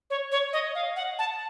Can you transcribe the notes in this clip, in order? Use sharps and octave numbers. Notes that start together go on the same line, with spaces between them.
C#5
C#5
D#5
F5
F#5
A5